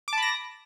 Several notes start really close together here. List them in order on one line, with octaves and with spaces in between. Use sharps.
D6 A5 B5 A#6